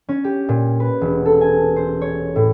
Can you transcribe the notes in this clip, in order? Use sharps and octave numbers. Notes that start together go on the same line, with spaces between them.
C#4
G4
A#2
B4
E1
A4
G#5
C5
C#5
A2